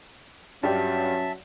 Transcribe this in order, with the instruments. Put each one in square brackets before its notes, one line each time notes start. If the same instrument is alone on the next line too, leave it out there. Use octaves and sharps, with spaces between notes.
[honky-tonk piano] G2 G3 G4 [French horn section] F#3 C#4 [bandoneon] E5 A5